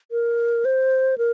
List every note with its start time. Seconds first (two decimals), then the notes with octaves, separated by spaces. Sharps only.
0.11 A#4
0.65 C5
1.18 A#4